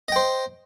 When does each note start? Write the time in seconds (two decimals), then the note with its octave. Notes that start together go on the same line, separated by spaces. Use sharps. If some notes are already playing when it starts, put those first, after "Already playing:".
0.08 D#5
0.12 G5
0.16 C5